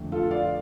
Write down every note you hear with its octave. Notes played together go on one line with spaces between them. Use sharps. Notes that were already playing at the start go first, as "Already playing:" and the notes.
Already playing: F2 D3 F3 A3
F4 A4
D5 F5